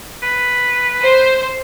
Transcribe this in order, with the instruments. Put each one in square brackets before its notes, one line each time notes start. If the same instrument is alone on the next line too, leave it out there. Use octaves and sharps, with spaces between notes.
[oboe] B4
[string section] C5